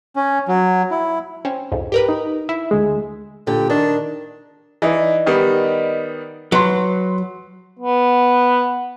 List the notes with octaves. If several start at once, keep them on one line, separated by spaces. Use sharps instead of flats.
C#4
F#3
E4
C4 C#4
C2 F2 G#2
G4 A#4 B4
D#4
E4 E5
D2 G#3
A#2 D3 G4
D#3 D4
E3 D#4 D5 D#5
D#3 G3 B3
F#3 B4 C6
B3